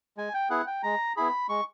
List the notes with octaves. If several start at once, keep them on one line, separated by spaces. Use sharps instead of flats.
G#3 G#5
G5
B3 E4 G#4 F#5
G5
G#3 A#5
B3 E4 G#4 B5
G#3 C#6